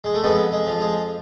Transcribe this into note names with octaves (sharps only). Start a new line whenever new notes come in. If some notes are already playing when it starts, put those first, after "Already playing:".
G#3
A3
F2 G#3 B3
G#3
F3
G#3